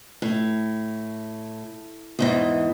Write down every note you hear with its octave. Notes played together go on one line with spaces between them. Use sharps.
A2
E2 G#2 E3